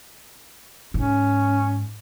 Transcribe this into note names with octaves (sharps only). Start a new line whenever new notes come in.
G#2 C#4